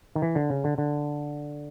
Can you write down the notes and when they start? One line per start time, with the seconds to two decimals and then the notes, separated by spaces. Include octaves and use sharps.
0.15 D#3
0.22 E3
0.35 D3
0.50 C#3
0.64 D3
0.78 D3